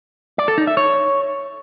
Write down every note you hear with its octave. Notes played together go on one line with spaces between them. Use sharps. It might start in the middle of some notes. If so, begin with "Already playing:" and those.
D5
A4
D#4
E5
C#5